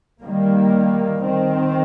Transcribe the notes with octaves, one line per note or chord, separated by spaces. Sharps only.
D#3 G3 A#3
D#3 C4